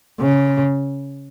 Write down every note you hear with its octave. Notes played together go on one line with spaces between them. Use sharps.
C#3